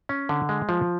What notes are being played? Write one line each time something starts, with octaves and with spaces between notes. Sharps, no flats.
C#4
D3
G#3
F3